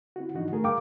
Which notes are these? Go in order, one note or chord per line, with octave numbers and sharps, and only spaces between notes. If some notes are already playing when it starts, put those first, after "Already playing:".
C4 E4 F#4
G#2 E3 F3 D4 D#4 F#4
D#3 A3 G#4 A#4
G2 A#4 F5 G5 D6